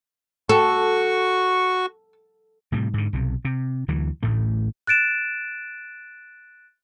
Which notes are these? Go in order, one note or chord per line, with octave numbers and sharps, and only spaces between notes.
F#4 A4 C#6
A2 C3 G3
G#2 D3
B1 C3
C3
D2 E3 F#3
A1 D2 A2 A3
F#6 A6 D7 E7